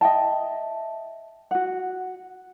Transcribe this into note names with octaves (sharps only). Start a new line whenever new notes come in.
D#5 E5 G5 A5
F#4 F#5